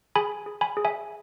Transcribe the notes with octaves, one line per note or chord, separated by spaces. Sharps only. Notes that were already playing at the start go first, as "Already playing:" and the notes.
G#4 G#5 B5
G#4
G#5 B5
G#4
E5 G#5